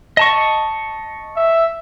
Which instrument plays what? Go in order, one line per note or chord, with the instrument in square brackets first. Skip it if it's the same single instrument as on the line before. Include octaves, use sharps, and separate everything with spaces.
[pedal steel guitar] D#5 A5 C#6
[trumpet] E5